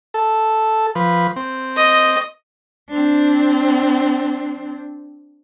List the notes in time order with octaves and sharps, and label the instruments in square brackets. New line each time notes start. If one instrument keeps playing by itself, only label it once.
[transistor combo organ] A4
F3 B4
C4
[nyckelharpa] D#5
[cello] C4 D4